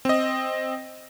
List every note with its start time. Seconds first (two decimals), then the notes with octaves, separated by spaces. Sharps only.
0.05 C4 D#5